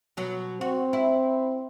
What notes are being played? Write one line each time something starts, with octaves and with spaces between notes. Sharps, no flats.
B2 F#3
C4 F#4
E4